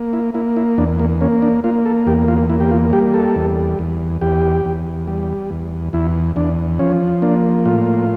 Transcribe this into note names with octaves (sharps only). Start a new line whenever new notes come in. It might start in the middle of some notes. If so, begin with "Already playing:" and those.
Already playing: A#3
E4
A#3 E4
E4
E2 D4
A#3
A#3 C#4
D4
A#3 F4
A4
E2 G4
F4
A#3 E4
G4
F4
G3 G4
A4
E2
E2
E2 G4
E2
G3
E2
E2 E4
E2 D4
F3 C#4
A#3 D4
A2 F4